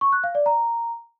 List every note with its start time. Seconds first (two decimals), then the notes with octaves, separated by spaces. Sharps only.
0.01 C#6
0.12 F#6
0.24 F5
0.35 D5
0.46 A#5